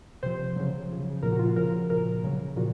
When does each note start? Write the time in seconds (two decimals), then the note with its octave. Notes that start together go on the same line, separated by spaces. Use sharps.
0.23 C3 F3 C5
0.56 C#3 F#3
0.89 C#3 F3
1.23 A#2 F3 A#4
1.32 F#4
1.39 F4
1.48 F#4
1.56 C#3 F3 A#4
1.90 A#2 F3 A#4
2.24 C#3 F#3
2.56 A#2 F3 F#4